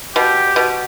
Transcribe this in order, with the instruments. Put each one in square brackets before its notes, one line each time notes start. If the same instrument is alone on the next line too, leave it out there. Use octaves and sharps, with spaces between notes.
[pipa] B2 [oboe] G4
[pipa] B2